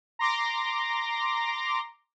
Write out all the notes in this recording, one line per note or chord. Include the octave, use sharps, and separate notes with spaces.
A#5 C6 D6 A#6